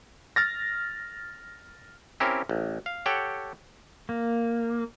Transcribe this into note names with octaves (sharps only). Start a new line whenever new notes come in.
F6 A6 A#6
C4 C#4 E4 G4 A#4
A1
F5
G4 A4 C#5 F#5 G5
A#3